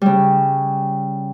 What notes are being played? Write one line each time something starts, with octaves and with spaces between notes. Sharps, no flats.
C#3 G3